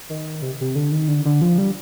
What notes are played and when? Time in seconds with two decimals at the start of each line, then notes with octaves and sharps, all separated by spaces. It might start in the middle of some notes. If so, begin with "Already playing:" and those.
0.09 D#3
0.42 C3
0.61 C3
0.75 D3
0.92 D#3
1.08 D3
1.25 D3
1.41 F3
1.58 G3